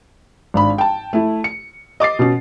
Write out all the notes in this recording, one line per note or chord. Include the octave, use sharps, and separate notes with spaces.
G#1 D4 B5
G5 A5
A3 E4
C#7
D#5 D6 A6 C7
B2 C#4